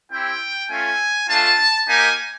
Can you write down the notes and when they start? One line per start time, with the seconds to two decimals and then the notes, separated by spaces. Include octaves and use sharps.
0.12 C4 E4 G4 G5
0.71 A3 C#4 F4 G#5
1.29 A3 D4 F4 A5
1.88 A#3 D#4 G4 G#5